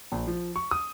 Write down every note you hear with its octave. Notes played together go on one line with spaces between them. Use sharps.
A#1
F3
C#6
D#6